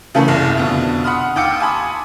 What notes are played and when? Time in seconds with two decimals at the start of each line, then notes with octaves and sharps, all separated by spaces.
0.14 C#3 E3 A3 A#3 C#4 A4
0.28 F#1 C2
0.57 F2 B2 D3
1.04 F#5 B5 C6 D#6 F6
1.36 D#2 G5 D6 E6 C#7
1.60 G#5 A5 B5 C6 D#6